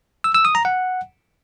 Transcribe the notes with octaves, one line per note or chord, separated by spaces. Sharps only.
E6
E6
D#6
A#5
F#5